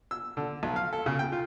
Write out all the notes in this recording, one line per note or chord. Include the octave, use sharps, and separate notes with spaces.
E6
D3
B1
F5
A4
C#3
G5
F4